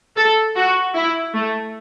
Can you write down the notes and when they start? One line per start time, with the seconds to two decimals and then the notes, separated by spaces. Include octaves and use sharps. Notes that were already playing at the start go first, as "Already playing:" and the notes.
0.16 A4
0.56 F#4
0.94 E4
1.34 A3